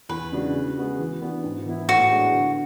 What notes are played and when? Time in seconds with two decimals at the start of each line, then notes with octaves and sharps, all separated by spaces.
0.09 E2 B4
0.32 C#3 G#3 D4 F#4
0.55 C#3
0.77 G#3 B3 F#4
0.99 E3
1.21 B3 D4 F#4
1.44 G#2
1.66 E3 B3 E4
1.88 A2 F#4
2.11 G#3 B3 D4
2.33 D3